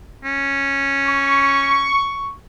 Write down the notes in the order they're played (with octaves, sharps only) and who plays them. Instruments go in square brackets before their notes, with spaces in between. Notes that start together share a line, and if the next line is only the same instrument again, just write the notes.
[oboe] C#4
[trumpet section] C#6